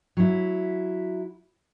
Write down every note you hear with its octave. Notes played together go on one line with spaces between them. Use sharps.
F#3 E4